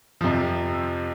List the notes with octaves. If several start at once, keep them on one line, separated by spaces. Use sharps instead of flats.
F2 C3 F3